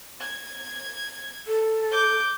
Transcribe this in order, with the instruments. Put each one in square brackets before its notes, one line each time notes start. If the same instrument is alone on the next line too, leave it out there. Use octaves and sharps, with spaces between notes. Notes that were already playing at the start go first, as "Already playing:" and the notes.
[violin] G#6
[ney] A4
[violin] D6 G6